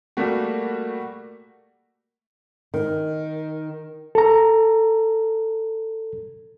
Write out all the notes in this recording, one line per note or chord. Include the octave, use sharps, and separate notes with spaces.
G3 A3 A#3 F#4
D#3
A4 A#5